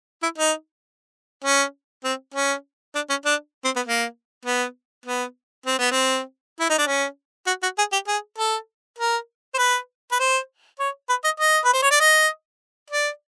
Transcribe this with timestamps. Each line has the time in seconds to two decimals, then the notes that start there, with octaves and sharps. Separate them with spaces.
0.23 E4
0.38 D#4
1.44 C#4
2.04 C4
2.34 C#4
2.95 D4
3.10 C#4
3.25 D4
3.65 C4
3.76 B3
3.86 A#3
4.46 B3
5.06 B3
5.66 C4
5.79 B3
5.91 C4
6.60 E4
6.70 D#4
6.78 D4
6.87 C#4
7.47 F#4
7.63 F#4
7.78 G#4
7.92 G4
8.08 G#4
8.38 A4
8.98 A#4
9.54 C5
9.58 B4
10.12 B4
10.19 C5
10.80 C#5
11.09 B4
11.24 D#5
11.40 D#5
11.65 B4
11.73 C5
11.82 C#5
11.91 D5
12.00 D#5
12.90 D5